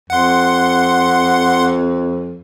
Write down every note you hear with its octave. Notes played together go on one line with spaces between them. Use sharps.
F2 F#5 C6